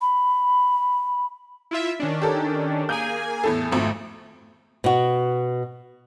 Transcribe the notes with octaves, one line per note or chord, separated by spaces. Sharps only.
B5
E4 F4 E5
D#3 C#4 D4
G4 A4 A#4
A#3 G#4 G#5 G6
E2 A2 A4
G#1 F2 A3
B2 F#4